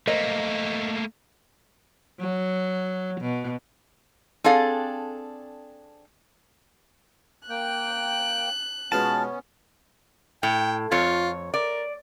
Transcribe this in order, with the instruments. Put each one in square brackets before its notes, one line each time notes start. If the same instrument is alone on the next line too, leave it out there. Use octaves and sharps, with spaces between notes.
[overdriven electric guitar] A3 A#3 [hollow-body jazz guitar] A#4 C5 D#5
[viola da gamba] F#3
B2
[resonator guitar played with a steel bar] C4 D4 G#4 A4 D5 F5
[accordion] A#3 G5 [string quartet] F#6
[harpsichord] B2 G#3 F4 [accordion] B3 C#4 [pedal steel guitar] A5
[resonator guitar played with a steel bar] A2 [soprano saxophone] G5
[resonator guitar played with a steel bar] F2 C#5 [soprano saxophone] F4
[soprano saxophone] A#4 [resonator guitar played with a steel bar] D5